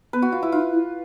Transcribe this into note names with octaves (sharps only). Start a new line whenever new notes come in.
B3 B4
F#4
F4
E4
D#4 F4
E4